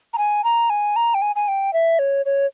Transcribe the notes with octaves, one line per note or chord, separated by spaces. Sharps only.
A#5
G#5
A#5
G#5
A#5
G5
G#5
G#5
G5
E5
C#5
C#5